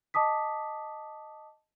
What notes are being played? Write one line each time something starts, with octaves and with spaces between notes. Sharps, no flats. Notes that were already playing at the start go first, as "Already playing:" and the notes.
D#5 A5 D6 D#6 B6